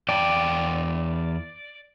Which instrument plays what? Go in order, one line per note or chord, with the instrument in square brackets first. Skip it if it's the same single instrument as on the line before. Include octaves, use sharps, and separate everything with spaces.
[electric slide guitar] E2 G5 A5 [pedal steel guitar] D5